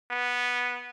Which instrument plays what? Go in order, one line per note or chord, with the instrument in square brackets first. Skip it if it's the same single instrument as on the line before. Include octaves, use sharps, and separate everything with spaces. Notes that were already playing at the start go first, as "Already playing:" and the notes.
[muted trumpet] B3